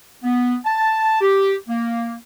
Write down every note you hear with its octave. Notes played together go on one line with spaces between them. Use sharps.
B3
A5
G4
A#3